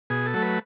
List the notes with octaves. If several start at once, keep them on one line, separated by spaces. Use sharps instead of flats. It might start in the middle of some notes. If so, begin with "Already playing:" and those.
B2 G#4
A4
F#3 A3
B4